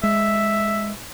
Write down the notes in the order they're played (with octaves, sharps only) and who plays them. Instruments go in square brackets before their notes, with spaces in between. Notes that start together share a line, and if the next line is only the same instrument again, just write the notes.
[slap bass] G#3 [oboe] E5